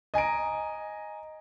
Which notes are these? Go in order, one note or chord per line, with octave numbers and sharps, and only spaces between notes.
D#5 G#5 A#5 D7